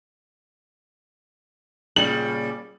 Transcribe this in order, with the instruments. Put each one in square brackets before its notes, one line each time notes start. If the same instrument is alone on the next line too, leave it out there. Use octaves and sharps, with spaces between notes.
[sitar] A#2 C#3 G3 [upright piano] F#7